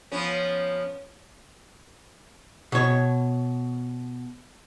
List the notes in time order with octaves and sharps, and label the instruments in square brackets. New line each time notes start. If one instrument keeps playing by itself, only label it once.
[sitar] F3 B3 C#4
[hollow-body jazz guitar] B2 C#5